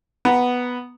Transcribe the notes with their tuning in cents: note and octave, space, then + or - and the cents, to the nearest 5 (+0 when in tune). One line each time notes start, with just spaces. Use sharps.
B3 +0 A#5 +15